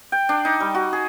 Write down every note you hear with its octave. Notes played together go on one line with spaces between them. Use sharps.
G5
D4
D#4
G3
F#4
G#4